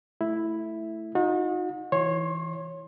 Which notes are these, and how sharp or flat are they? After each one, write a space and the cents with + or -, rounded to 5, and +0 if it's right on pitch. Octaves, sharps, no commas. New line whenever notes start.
A3 +0 E4 +0
D#4 +10 F#4 -40
E3 +0 C#5 -5 C6 +25